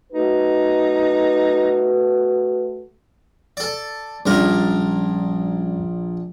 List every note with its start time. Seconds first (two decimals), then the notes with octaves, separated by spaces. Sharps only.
0.13 A3 D#4 F#4 B4
3.57 A4 D5
4.26 A#1 G3 C#4 D4 A#4